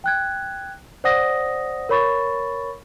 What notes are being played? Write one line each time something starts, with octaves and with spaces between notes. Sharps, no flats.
G5 F#6 G#6
C5 D5 F#5 D#6 A#6
A#4 C#5 B5 C#6 A6